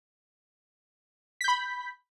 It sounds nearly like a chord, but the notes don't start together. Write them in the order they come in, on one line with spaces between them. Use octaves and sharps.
B6 G6 B5